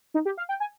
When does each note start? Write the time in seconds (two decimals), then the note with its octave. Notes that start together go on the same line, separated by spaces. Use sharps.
0.14 D#4
0.25 G4
0.37 F5
0.49 G5
0.60 G#5